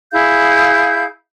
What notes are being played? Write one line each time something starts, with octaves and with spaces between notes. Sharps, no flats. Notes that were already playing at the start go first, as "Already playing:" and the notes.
E4 G#4 F5 G6